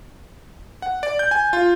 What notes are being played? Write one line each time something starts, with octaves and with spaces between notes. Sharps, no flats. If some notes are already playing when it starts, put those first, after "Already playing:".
F#5
D5
G6
G#5
F4